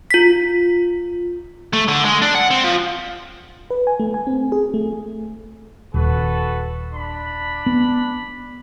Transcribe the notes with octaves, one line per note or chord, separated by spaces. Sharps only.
F4 B6
A3
D3
G#3
D4
F#5
C4
F3
B4
G#5
A3
G#5
C4
G#4
A3
D#1 F#4 A4 B4
D4 B5
B3